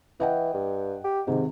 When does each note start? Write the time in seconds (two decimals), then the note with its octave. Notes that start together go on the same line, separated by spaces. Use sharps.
0.20 E3 D#5 F#5 G5
0.54 G2
1.04 G4
1.27 G#2 C3 D#3